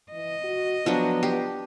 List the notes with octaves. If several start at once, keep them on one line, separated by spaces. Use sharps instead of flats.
E3 D#5
F#4
F3 F#3 B3 D4
G4